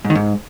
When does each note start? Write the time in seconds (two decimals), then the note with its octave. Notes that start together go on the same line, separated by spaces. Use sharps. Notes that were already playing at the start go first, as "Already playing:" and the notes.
0.05 G#2
0.10 D#3
0.15 G#2